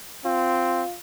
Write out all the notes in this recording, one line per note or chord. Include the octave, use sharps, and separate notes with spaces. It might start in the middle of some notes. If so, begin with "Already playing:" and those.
C4 F4